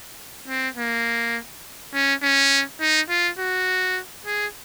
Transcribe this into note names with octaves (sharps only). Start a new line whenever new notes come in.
C4
A#3
C#4
C#4
D#4
F4
F#4
G#4